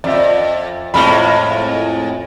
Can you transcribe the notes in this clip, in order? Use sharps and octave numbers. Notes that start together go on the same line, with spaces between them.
F2 D5 E5
F2 A2 G#3 B5 F6